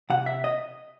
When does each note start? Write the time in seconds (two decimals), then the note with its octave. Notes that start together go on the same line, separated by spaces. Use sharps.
0.10 C3 F#5
0.26 E5
0.44 D#5